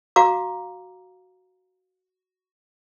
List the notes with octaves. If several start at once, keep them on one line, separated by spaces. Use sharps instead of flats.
F#4 F5 A#5 D6